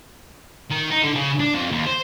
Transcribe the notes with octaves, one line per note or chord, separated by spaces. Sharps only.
D#3
D#4
D3
C#3
D4
F2
D#2
C5